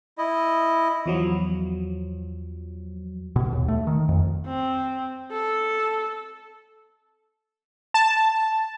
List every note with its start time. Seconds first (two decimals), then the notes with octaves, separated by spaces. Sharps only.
0.18 E4 D#5
1.06 E2 F3 F#3
3.36 B2
3.53 D#2
3.68 A3
3.87 D#3
4.09 F2
4.46 C4
5.31 A4
7.94 A5